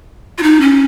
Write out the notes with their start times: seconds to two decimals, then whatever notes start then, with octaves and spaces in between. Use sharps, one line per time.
0.38 F4
0.43 D#4
0.61 C#4